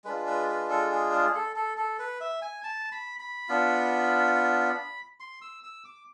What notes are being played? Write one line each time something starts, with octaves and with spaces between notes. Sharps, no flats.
G#3 D4 F4 B4
B4
B4
A4
G#4
G#4
A4
A4
A4
B4
E5
G#5
A5
B5
B5
B3 D4 F4
C6
E6
E6
D6